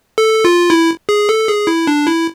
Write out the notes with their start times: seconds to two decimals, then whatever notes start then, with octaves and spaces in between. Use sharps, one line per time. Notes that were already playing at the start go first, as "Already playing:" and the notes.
0.18 A4
0.45 F4
0.70 E4
1.09 G#4
1.29 A4
1.48 G#4
1.67 E4
1.87 D4
2.06 E4